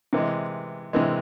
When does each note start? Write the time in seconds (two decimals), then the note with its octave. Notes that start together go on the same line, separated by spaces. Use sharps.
0.13 C3 E3 G#3
0.93 C3 E3 G#3